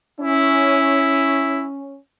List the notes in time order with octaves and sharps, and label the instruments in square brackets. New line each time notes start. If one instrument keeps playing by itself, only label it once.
[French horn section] C#4 [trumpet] E4